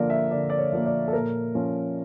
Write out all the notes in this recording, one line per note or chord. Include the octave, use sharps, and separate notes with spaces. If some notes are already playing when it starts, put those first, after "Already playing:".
Already playing: D3 F3 A#3 A#4 D5
E5
D3 D5
D5
C#5
F3 A#3
D5
A4
A#2 A#4
F3 C#4